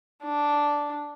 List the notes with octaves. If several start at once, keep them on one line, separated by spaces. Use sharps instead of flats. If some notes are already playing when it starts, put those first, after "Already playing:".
D4